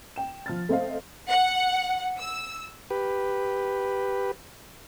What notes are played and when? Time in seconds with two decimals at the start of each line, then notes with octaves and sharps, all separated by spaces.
0.16 G5 E7
0.46 F3 F6 A6
0.69 A3 C4 C5 D#5 F5
1.31 F#5
2.20 E6
2.90 G4 B4